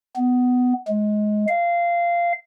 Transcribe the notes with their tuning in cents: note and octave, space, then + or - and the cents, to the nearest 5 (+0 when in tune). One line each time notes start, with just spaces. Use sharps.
B3 +15
G#3 +20
F5 -15